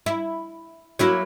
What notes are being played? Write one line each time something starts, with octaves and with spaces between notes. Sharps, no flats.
E4
F#3 A#3 E4